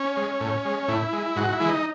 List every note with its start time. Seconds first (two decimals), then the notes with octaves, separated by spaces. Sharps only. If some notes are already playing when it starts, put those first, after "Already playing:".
Already playing: C#4
0.17 G#3
0.40 A2
0.65 G#3
0.88 A2 E4
1.13 G#3
1.36 G#2 F#4
1.53 E4
1.60 E3 G#3
1.69 D#4